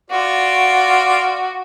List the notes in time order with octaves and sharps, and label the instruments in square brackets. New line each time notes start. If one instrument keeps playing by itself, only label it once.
[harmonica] F4 D5 [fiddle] F#4